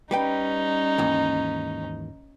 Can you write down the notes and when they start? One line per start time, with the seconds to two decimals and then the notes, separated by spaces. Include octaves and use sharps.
0.11 G3 C#4 D#4 B4 G5
0.98 D#2 G#2 E3